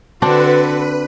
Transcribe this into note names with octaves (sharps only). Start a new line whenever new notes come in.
D3 C4 D4 F#4 B4 D5